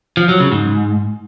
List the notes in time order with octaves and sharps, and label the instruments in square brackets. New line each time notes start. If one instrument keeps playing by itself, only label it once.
[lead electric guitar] F3
F#3
C#3
G#2